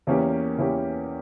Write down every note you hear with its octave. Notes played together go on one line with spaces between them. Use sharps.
E2 E3 A#3 C#4 G4
E2 E3 A#3 C#4 G4